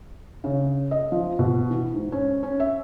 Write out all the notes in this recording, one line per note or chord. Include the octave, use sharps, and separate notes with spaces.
C#3
D#5
F3
B2
E3
G#2
C#4
C#4
E5